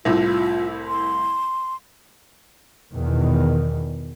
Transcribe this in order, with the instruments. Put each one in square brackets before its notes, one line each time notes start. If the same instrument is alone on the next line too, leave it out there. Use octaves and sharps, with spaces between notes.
[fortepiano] C2 A2 [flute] F4
[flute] C6
[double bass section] E2 B2 D#3